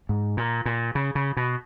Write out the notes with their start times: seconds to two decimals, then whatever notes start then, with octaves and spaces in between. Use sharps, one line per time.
0.09 G#2
0.37 A#2
0.66 A#2
0.95 C#3
1.15 C#3
1.37 B2